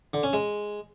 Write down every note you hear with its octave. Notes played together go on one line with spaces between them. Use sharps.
D3
C#4
G#3